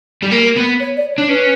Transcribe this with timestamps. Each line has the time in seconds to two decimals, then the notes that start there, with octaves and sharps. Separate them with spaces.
0.22 G3
0.31 A#3 A#4
0.56 B3
0.80 C#5
0.97 D5
1.13 C#5
1.18 D4
1.29 C#4 B4